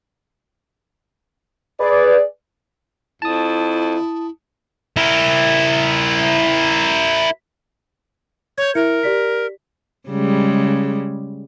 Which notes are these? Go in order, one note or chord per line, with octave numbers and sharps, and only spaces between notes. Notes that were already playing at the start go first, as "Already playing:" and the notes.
G#4 B4 D5
F2 E4 A5 D#6
E4 A#4
C#5 G6 G#6
E4 A#4 E5 C#7
G4 D5 B6
C#3 G3 G#3